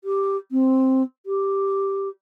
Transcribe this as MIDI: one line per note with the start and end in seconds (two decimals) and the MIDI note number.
0.04 0.37 67
0.52 1.03 60
1.26 2.09 67